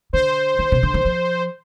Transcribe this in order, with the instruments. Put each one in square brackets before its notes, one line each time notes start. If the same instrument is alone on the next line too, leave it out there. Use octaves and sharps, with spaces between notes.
[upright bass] D3 [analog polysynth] C5
[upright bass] D#3
C3
D3
D#3
F3